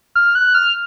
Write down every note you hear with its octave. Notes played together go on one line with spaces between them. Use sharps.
F6
F#6
F6